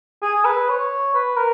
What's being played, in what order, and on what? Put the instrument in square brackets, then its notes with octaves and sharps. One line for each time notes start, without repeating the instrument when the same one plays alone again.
[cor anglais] G#4
B4
C#5
B4
A#4